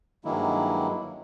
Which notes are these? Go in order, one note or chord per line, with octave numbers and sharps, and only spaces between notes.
G2 D#3 F#3 G#3 A#3 E4